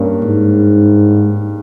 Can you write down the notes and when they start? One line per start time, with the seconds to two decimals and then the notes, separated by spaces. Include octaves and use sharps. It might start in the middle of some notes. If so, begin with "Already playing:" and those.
Already playing: G2 A#3 C#4
0.23 G#2